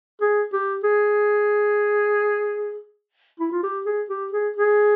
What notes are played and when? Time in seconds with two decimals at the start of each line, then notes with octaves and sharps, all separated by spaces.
0.21 G#4
0.53 G4
0.84 G#4
3.40 E4
3.52 F4
3.63 G4
3.86 G#4
4.10 G4
4.33 G#4
4.57 G#4